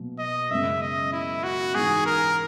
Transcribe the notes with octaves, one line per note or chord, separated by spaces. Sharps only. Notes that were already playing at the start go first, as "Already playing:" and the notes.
Already playing: B2 F#3 A#3
D#5
F#2 C#3 G#3 E5
D#5
E4
F#4
G#2 E3 G#3 G#4
A#4